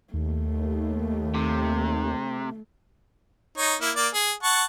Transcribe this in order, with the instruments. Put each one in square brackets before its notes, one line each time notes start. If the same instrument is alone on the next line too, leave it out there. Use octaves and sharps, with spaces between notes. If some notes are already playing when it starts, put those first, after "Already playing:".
[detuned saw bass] D#2 [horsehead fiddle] A3
[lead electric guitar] C3
[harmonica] D#4 C#5
A#3 E4
A#3 D5
G#4
F#5 A5 C#6